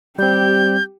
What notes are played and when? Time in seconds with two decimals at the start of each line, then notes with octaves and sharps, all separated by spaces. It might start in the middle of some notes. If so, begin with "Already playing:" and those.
0.19 G3 C4 G4 G6